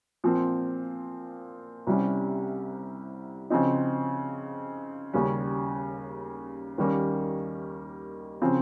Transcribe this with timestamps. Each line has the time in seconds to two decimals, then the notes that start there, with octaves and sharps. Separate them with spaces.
0.24 A#2 F3 C4
1.87 C2 C3 G3 C#4
3.50 C#3 F3 C4 D#4
5.13 D#2 C#3 G3 C#4
6.78 D#2 D#3 G3 A#3 C#4
8.42 C#3 F3 C4